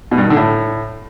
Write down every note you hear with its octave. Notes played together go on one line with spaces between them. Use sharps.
B2
G2
D#3
D3
A2